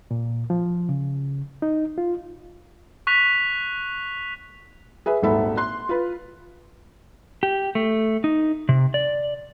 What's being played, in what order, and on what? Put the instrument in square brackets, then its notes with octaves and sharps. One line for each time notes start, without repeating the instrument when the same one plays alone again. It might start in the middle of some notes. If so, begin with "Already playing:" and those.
[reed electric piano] A#2
F3
C#3
D#4
F4
[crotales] C#6 F#6 B6 F7
[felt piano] G#4 B4 E5
D#1 G#1 G#2 A4 E5 B5
C6 F#6
F4 B4
[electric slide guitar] G4
A3
D#4
C3
D5